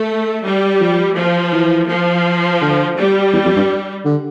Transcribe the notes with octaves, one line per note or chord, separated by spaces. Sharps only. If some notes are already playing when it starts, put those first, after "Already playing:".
Already playing: A3
G3
F3
F3
E3
F3
D3
G3
E2
F2
G2
D3